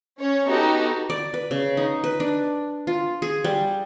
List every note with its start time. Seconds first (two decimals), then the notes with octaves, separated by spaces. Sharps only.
0.18 C#4 C#5
0.48 B3 D#4 F#4 G4 A4
1.10 D5
1.34 B4
1.51 C#3
1.77 D#4
2.04 B4
2.20 D4
2.87 F4
3.22 G#4
3.44 G3